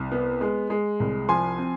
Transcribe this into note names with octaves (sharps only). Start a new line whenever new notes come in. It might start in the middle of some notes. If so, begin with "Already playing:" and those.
Already playing: C2
B3
G#3
G#3
C2
F3 G#5 C6
C4